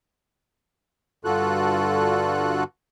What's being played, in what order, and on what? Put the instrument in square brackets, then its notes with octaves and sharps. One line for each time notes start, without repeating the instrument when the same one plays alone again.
[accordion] G2 D3 F4 F#4 A4 F#6